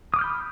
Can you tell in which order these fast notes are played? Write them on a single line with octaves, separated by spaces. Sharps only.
D#6 D6 F6 G6 B5